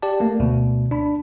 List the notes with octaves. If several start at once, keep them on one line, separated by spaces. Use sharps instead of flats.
G4 D5 A5
A3 A#3
D2 B2
D4 B5